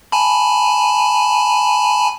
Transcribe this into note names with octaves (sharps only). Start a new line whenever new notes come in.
G#5 A5 B5